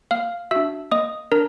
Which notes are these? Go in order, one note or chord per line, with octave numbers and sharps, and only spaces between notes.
A#3 F5 F6
D4 F#4 E5 E6
A#3 D#5 D#6
D4 A#4 A#5